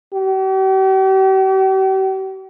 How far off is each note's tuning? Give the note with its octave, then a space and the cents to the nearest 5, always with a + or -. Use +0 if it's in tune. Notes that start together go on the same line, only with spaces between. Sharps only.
G4 -45